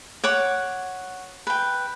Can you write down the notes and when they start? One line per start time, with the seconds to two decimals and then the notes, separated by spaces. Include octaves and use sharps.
0.24 C#5 F#5 D6
1.47 B4 G5